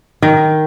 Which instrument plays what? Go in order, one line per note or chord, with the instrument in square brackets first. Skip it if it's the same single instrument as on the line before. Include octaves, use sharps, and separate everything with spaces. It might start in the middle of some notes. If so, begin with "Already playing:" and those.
[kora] D#3